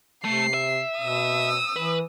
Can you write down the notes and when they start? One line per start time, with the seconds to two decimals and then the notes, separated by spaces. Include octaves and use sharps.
0.25 C3 A3 C7
0.54 E5
1.00 B2 D#6 E6
1.76 E3 B4